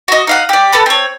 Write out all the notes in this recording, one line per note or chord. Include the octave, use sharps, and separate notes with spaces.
F#4 D#5
D#4 F5 F#5
G4 D5
A4 B4 A5 F#6
C4 C#5